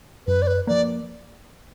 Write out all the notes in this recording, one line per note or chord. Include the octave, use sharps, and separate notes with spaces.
F#2 B4
D5
B4
F3 A#3 D5